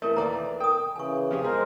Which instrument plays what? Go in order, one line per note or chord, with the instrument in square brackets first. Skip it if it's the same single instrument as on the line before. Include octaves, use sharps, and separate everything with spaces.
[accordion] E3 [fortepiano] A3 [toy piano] E4 A#4 C#5
[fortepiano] D#2 D5 [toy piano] A#5
[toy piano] A#4 D#6 [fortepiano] G5
[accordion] C#3 E3 [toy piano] G#5 C#6
[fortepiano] F3 G4 G#4
[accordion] G#3 A#4 C5 [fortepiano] G#4